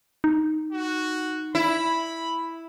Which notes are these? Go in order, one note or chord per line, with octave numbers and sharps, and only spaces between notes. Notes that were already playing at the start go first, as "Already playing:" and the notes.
D#4
F#4
E4 B5